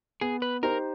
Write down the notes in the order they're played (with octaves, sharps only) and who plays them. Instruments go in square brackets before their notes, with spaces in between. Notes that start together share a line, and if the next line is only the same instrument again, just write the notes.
[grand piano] B3 [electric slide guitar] G#4
[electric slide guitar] B4
[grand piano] D#4 G4 C5 [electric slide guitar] A#4